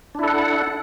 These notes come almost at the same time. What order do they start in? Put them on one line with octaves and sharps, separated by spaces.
D4 E4 A4 F#5